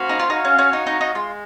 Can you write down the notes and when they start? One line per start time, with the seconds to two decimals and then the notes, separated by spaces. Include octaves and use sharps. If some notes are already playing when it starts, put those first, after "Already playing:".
Already playing: A#3 C#4 F#4 C5 F5
0.09 D#4
0.20 F4
0.30 D#4 F#4 C#5 F5
0.45 C#4
0.59 C#4
0.73 D#4
0.87 D#4
1.01 D#4
1.15 G#3 F4